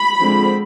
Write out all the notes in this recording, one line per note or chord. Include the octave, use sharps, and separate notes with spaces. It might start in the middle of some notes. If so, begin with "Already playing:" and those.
Already playing: B5
D3 F3 G#3 C4